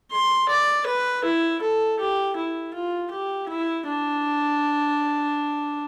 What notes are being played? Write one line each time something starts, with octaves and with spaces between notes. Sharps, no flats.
C6
D5
B4
E4
A4
G4
E4
F4
G4
E4
D4